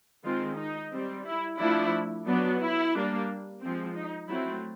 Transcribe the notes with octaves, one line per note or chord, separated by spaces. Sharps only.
D#3 G#3 C4 F4
D#4
G3 C4
E4
F3 A3 D4 E4
F#3 B3 D4
E4
G3 A#3 D4
F3 G#3 C4
D#4
F#3 A3 C4 E4